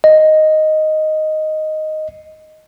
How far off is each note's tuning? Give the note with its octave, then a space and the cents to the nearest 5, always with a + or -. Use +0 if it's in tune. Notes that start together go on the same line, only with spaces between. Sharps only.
D#5 +0